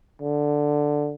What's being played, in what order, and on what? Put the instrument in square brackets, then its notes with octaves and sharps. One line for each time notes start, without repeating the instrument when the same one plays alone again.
[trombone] D3